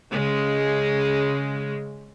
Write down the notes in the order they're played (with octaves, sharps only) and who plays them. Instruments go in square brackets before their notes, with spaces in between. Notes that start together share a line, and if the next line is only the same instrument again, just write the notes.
[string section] C#3 G#3